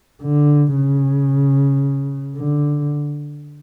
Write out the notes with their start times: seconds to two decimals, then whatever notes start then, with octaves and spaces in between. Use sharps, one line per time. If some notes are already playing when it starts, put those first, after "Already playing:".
0.22 D3
0.75 C#3
2.37 D3